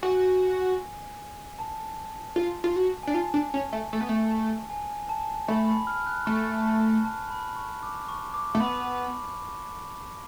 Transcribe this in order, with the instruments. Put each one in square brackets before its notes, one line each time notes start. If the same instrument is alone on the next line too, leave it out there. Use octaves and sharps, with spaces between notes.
[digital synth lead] F#4 [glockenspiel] G#5
[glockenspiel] A5
[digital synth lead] F4
F4
F#4
[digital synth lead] D4 [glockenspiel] G#5
[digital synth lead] F4 [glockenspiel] A5
[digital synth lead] D4
C#4
A3
A3
B3
A3
[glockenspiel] G#5
A5
[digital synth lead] A3 [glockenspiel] B5
[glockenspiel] B5
F6
F#6
[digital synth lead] A3 [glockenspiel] C#6
[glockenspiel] A5
A5
B5
C#6
D6
C#6
D6
[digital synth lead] A3
[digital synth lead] B3 [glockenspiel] B5